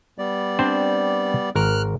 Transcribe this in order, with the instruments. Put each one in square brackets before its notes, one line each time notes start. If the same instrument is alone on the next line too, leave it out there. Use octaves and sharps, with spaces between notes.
[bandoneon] G3 B3 D5
[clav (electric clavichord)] C4 D4 C5
[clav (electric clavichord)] G#1 A#4 [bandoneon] F6 F#6